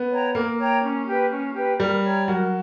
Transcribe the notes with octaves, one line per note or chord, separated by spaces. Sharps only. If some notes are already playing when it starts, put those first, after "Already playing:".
Already playing: B3
C#5 G5 A#5
A#3 A#4
C#5 G5 A#5
C#4
G4 B4
C#4
G4 B4
G3 A#4
C#5 G5 A#5
F#3 A#4